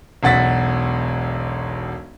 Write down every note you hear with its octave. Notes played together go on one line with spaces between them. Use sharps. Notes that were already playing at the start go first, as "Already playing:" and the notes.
E1 B1 F#5 A6 B6